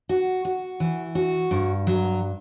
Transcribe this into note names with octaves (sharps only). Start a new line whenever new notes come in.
F#4
F#4
E3
F#4
G2
F#3